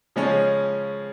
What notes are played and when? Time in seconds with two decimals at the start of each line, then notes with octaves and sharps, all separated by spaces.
0.16 C#3 F3 G#3 C#4